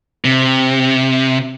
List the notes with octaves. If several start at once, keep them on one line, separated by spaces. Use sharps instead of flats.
C3